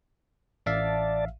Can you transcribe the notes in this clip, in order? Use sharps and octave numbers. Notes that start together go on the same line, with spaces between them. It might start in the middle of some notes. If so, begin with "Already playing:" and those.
A1 D5 E5 F5 A5